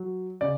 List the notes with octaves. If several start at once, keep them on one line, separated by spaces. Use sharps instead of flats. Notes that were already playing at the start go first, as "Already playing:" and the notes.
Already playing: F#3
C#3 D5